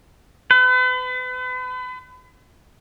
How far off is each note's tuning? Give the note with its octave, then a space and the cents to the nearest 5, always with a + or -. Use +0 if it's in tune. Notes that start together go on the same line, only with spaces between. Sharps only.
B4 +40